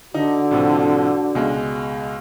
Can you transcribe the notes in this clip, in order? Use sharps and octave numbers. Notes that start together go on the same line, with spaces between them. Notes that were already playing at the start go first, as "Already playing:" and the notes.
D3 D#4 F#4
A2 C3 F3
C#2 B2 G#3